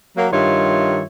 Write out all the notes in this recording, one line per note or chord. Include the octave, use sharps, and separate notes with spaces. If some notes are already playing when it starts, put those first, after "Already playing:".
F#3 A#3
G2 D#3 F4 C#5 E5